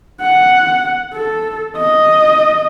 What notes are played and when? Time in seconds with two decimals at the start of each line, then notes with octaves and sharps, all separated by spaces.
0.21 F#5
1.13 A4
1.77 D#5